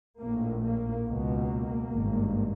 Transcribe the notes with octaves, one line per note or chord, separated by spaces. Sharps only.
A#1 A2 A#3
A#3
C#2 B2 A#3
G#1 G2